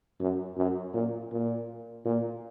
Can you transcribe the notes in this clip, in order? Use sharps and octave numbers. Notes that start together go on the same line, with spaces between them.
F#2
F#2
A#2
A#2
A#2